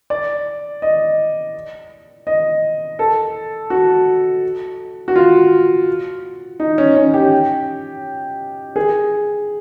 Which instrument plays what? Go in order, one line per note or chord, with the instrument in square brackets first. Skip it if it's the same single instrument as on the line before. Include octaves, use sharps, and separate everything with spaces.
[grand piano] D5
D#5
D#5
A4
F#4
F#4
F4
D#4
C#4
C#4
G4
G#4